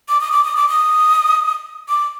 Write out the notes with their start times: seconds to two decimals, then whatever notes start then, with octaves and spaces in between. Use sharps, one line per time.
0.09 D6
0.21 D#6
0.32 D6
0.44 D#6
0.56 D6
0.69 D#6
1.89 D6